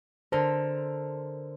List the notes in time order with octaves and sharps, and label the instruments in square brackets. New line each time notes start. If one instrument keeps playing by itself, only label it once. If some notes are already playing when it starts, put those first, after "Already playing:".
[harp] D3 A4 A#4 [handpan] C5